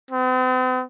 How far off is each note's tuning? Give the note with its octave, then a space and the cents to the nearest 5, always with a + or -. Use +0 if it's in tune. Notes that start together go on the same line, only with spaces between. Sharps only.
C4 -45